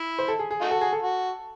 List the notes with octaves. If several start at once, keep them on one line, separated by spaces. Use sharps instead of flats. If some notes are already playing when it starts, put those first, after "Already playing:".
Already playing: E4
C5
A4
G#4
G#4
A3 D#4 F#4
A4
G#4
A4
F#4